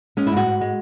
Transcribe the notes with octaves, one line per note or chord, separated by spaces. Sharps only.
G#3 C#4
E4
G#2
F#4
G#2
G#3